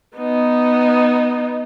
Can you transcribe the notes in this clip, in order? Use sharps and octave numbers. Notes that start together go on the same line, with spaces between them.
B3 D#4